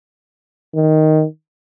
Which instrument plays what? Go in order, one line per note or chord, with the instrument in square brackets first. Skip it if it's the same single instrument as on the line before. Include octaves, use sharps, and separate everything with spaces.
[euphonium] D#3